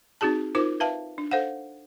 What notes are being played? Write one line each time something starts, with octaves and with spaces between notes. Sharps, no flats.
C4 D#4 F#4 G#4 A5
D#4 F4 A#4 C5 D6
B4 E5 F5 A5
D4
A4 C5 F5 F#5